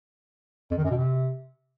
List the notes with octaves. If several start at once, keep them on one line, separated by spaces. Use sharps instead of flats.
F2
D#3
F#2
B2
C3